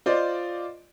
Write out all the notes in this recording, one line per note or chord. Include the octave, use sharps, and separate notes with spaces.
F4 C5 D5 D#5